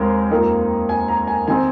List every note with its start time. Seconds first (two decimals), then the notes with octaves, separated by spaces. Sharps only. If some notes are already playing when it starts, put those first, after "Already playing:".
Already playing: D#2 G#3 C4 D#4 A#4 C5 G#5
0.30 F2 F3 A#3 D#4
0.89 G#5
1.08 A#5
1.27 G#5
1.47 D#3 C4 D#4 G#5